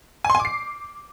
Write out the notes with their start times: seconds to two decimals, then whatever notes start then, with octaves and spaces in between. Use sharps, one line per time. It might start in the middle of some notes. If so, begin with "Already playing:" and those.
0.25 G#5
0.30 C6
0.35 G#5
0.40 D6
0.45 C7